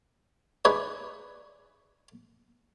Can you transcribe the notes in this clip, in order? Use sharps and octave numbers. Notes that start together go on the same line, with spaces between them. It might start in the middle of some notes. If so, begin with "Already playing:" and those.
D#4 G#4 B4 C#5 D5